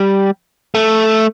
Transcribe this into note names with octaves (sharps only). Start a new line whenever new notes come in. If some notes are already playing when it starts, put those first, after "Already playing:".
Already playing: G3
A3